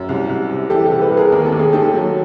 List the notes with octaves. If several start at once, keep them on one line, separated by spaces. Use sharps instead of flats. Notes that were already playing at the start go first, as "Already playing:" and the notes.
Already playing: F#2
C2
C2
C3
E3 G4 A4
G4 A4
C2
A4 B4
C2
G#4 A#4
D#2 A#4
A4
D#2
G#4
D#3 G4 A4
F#3